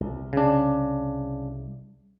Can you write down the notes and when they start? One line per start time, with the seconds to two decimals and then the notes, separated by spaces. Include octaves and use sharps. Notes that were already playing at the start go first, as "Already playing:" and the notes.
0.01 C2
0.33 C#3 D4